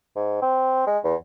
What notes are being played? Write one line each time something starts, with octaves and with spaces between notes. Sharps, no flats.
G#2
C4
G#3
E2